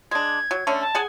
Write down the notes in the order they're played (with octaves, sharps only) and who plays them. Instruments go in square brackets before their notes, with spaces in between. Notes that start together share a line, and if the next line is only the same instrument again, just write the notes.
[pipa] G#3 D4 [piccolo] G#6
[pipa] F#3
D3 A3 C#4
[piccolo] A5
[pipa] G#4 F#5 G#5